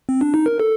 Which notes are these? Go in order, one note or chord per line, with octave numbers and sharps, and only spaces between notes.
C4
D4
D#4
A#4
A4